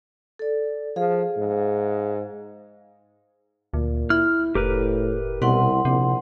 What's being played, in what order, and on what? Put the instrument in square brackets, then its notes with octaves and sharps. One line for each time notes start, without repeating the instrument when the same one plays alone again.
[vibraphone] A4 D5
[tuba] F3 [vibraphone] G#4 F5
[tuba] G#2
[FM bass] D2 [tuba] A#2
[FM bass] E4 [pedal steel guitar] F6
[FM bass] F1 [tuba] A2 [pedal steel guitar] G4 A#4 B4
[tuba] C2 [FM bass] B2 [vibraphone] E4 F#5 C6
[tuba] A#1 [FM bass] C3